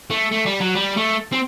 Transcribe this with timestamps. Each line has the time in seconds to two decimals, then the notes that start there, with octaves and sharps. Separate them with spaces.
0.11 A3
0.32 A3
0.46 G3
0.60 F#3
0.75 G3
0.97 A3
1.32 C4